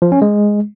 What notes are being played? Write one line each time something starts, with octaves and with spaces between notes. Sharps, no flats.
F3
C#4
G#3